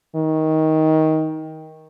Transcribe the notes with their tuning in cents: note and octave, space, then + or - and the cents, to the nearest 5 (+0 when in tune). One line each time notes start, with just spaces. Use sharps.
D#3 +20